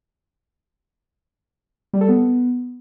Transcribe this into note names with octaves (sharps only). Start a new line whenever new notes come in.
G3
A4
B3